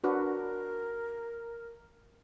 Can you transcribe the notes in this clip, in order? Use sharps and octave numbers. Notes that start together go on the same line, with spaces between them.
D4 F#4 A#4 B4